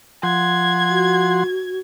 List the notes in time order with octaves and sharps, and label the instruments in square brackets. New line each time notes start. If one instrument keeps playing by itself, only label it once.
[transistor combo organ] F3 F#5 C6 [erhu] G#6
[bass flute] F#4